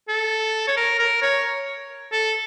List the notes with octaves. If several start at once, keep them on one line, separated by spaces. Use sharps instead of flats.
A4
C#5
A#4
A#4
C#5
A4